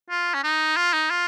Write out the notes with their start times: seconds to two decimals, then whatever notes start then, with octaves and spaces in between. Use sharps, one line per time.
0.10 F4
0.34 C#4
0.44 D#4
0.76 F4
0.93 D#4
1.10 F4